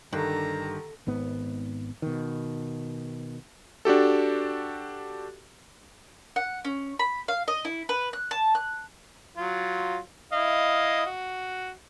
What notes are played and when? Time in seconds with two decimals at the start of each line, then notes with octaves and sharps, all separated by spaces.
0.13 G2 D3 D#3 G4 A4 A#5
1.07 G#1 G#2 B3
2.02 B2 D#3
3.85 D4 F#4 G4 A4
6.36 F#5
6.65 C#4
6.99 B5
7.28 F5
7.48 D#5
7.65 E4
7.89 B4
8.13 F#6
8.31 A5
8.55 F#6
9.37 F#3 F4
10.32 E4 D#5 F5
11.06 F#4